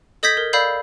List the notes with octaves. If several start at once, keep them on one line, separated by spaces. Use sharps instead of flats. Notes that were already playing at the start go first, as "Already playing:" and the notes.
A4 D#5 D#6 G6 G#6 B6
A#4
D5 F5 B5 E6 G6 C7